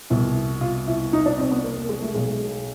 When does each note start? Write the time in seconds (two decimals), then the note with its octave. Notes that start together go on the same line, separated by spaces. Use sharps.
0.10 C2 B2 E4
0.61 F4
0.88 E4
1.13 D#4
1.26 D4
1.38 C4
1.51 B3
1.64 A#3
1.76 A#3
1.89 G#3
2.02 A3
2.14 B1 B2 G#3